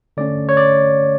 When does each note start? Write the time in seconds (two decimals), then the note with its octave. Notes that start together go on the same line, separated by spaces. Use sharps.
0.17 D3 A3 C#4 D5
0.49 C#5
0.57 D5